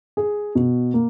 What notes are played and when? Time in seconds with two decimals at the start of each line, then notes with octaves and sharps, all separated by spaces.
0.17 G#4
0.55 B2
0.94 A#3